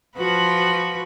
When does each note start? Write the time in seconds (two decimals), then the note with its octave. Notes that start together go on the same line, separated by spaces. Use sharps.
0.18 F3 F#4 B4